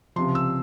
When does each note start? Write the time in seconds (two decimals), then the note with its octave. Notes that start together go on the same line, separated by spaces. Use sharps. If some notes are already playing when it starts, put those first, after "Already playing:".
0.16 C#2 C3 F3 C6
0.35 E6